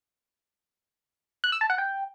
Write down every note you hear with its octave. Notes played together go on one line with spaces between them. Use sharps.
F#6
E6
A5
F#5
G5